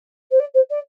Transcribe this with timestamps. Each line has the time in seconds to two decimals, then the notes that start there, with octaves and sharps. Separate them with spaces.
0.31 C5
0.39 D5
0.54 C5
0.70 D5